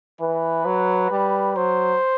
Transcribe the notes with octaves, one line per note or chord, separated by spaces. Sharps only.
E3 B4
F#3
G3
F#3 C5